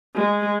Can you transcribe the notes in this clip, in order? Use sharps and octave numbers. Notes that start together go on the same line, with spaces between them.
G#3